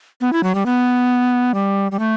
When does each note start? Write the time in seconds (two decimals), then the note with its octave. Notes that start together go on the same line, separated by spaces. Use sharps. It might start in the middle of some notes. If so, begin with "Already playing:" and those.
0.21 B3
0.33 E4
0.43 F#3
0.55 G3
0.66 B3
1.54 G3
1.92 G3
1.99 A3